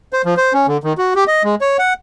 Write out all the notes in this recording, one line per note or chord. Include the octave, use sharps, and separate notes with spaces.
C5
F3
C5
C#4
D3
D#3
F#4
G4
D#5
G#3
C#5
F#5